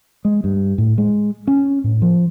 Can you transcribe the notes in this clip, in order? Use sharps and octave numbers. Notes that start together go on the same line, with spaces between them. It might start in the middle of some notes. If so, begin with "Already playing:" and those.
G#3
G2
A2
G#3
C#4
A2
F3